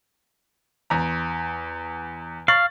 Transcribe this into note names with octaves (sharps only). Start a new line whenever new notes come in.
E2 A#5
F5 C#6 A6 F#7